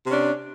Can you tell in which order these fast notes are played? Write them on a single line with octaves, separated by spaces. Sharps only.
C3 C#4 D4